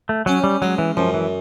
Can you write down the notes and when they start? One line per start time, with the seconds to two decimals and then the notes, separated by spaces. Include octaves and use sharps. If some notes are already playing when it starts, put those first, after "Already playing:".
0.09 A3
0.26 F#3 C#4
0.44 G3
0.62 F#3 G#3
0.78 E3
0.97 F#2 F3
1.14 E3